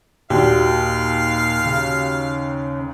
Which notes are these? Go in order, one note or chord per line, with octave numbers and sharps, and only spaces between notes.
D#2 A#2 F#4 G4 F5
C#3